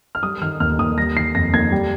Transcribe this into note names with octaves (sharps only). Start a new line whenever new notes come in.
F6
G3 D#6
D#3 F6
D#2 F6
D#2 D#6
G3 A#6
D#3 C7
F2 A#6
A#3 G#6
G3